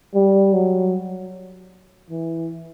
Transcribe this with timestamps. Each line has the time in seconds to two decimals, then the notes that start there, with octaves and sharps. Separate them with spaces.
0.15 G3
0.54 F#3
2.10 E3